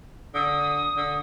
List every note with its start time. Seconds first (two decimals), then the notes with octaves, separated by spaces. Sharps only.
0.34 D3 D#6
0.97 D3